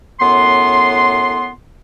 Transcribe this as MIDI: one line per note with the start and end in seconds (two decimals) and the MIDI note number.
0.20 1.49 42
0.20 1.49 45
0.20 1.49 59
0.20 1.49 84